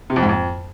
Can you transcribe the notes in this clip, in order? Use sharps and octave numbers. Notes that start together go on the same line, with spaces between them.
C3
F2
G#2
F2